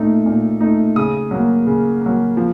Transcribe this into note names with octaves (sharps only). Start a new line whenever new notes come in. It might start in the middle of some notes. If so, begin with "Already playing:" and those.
Already playing: A#2 A3 D#4
A#2
A3 D#4
C#3 D#6
F#3 A#3
C#3
F#3 A#3
F3